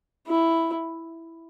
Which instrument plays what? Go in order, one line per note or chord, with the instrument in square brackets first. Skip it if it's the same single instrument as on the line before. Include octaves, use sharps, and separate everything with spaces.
[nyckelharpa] E4